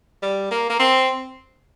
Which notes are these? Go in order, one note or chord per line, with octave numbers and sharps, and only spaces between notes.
G3
A#3
A#3
C4